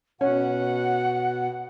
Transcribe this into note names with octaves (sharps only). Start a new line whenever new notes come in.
B2 C#4 F#5